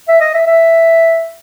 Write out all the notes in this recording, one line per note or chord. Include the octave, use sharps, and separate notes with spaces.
E5
D#5
E5
E5